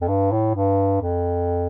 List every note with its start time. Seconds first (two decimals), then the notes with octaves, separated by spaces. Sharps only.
0.01 F2
0.08 G2
0.32 A2
0.55 G2
1.01 F2